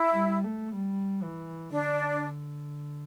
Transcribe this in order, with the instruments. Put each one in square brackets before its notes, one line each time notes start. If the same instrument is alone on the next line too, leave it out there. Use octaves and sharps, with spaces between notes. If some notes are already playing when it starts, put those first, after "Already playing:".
Already playing: [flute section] E4
[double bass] G3
A3
G3
E3
[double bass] D3 [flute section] D4